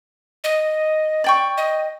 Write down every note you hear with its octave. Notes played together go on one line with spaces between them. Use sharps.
D#5
D5 G5 C#6
D#5